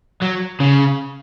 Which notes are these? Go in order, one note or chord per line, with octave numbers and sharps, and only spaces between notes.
F#3
C#3